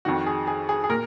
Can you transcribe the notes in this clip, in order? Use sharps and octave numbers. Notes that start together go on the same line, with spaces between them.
F2 D#3 F#4
G#4
G#4
G#4
G#4
A#2 A#4